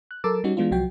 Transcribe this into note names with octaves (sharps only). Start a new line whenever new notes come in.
F#6
F#3 A4 A#4 D6 E6 A6
G3 C#4 D#4 F#4
E3 G#3 B3 D4 F4
C2 F3 F#3 F#4 G5